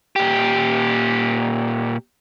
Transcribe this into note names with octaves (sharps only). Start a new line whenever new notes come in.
A#2 G4